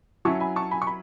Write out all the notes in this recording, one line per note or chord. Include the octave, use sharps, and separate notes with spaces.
F#3 C#4 E4 A5 C#6
G#5 B5
A5 C#6
G#5 B5
C#6
B5